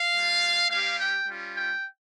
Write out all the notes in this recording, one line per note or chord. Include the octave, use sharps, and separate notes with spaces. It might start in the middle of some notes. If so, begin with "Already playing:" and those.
Already playing: F5
G3 A#3 F4
G3 C#4 G4 F5
G5
G3 C#4 F4
G5